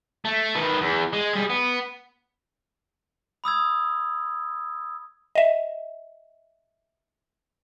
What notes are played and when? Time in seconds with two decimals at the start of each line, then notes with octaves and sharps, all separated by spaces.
0.25 A3
0.55 D#3 B4
0.81 E2
1.13 G#3
1.33 G3 G#4
1.50 B3
3.44 B5 D#6 E6 G#6
5.35 D#5 E5